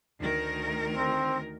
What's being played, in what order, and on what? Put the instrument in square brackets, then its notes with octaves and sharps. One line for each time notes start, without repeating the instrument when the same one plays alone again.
[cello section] D2 D#3 A#4
[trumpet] C4